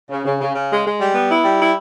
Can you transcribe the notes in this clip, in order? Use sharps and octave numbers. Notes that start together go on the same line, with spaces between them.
C#3
C#3
C#3
C#3
G#3
G#3
G3
B3
E4
G3
E4